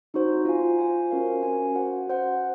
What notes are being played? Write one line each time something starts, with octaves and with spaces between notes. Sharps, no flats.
C4 D#4 F#4 C5
F4 C5 F5 G#5
F4 C5 F5 G#5
C#4 F#4 A#4 F5 G#5
C#4 F#4 A#4 F5 G#5
F#4 C5 F#5
F#4 C5 F#5